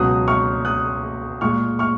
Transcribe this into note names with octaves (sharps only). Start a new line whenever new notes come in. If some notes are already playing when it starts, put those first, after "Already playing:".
Already playing: C#2 B2 F#3 D#6 F#6
C#6 F6
D#6 F#6
A#2 G#3 C#6 F6
C#6 F6